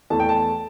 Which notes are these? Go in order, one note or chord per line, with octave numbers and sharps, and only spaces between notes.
E2 E3 A3 A5
G5
A5